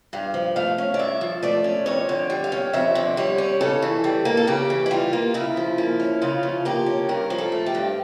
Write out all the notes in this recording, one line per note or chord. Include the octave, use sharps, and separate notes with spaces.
G2 F5
F3
A3 F5
C#4
D5
G2 E5
F3
A3 D5
C#4
F2 C#5
D3
G3
F5
C#4
F2 E5
D3
G3 C#5
C#4
C#3 A4
E3
G3
A#3
A4
C#3 G4
E3
E4
G3 F4
A#3
C#3 E4
F3
A#3
C#4
C#3 F4
F3
A#3 G4
C#4
G2 A#4
F3
A4
A3
G4
G2